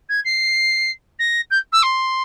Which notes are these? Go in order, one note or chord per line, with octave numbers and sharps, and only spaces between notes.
G#6
C7
A#6
G6
E6
C6